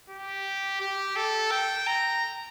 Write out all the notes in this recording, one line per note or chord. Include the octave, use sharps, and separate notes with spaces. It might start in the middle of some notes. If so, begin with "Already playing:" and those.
G4
G4
A4
G5
A#5